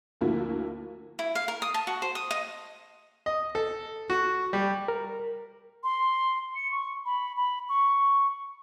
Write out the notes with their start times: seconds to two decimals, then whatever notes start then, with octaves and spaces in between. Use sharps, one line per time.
0.21 D2 F3 A#3 E4 F#4
1.19 E4
1.35 F5
1.48 A#4
1.62 D#6
1.74 A5
1.87 F#4
2.02 C5
2.15 D#6
2.31 D#5
3.26 D#5
3.55 A4
4.10 F#4
4.53 G3
4.88 A#4
5.84 C6
6.55 C#7
6.71 C#6
7.05 B5
7.37 B5
7.69 C#6